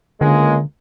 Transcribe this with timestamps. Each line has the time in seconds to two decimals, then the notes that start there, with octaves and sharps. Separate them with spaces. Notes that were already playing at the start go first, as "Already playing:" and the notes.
0.21 C#2 D3 G#3 A#3